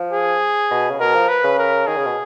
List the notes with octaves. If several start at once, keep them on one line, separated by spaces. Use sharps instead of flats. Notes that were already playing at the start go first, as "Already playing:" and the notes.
Already playing: F3
G#4
B2
C#3
B2 A#4
F3
B4
C#3
A#4
D#3 G#4
C#3
B2